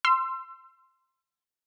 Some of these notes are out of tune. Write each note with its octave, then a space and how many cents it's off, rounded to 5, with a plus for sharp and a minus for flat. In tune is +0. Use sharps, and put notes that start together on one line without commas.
C6 +0 E6 +35